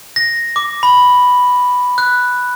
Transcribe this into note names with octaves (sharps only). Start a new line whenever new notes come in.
A#6
D6
B5
F#6